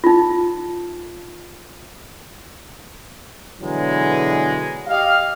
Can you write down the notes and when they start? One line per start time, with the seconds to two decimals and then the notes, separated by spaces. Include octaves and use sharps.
0.04 D#4 F4
3.61 B2 D3 E3 F#3 G#3
4.88 G4 D#5 F5